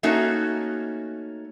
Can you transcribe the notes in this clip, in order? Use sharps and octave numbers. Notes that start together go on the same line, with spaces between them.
A3 A#3 C#4 D#4 F#4